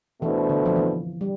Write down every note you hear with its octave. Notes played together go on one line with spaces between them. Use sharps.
B2 E3 A3 D4 A4 C5
D3
F3
E3
G3